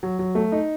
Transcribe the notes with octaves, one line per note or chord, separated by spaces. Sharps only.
F#3
F#3
A3
D#4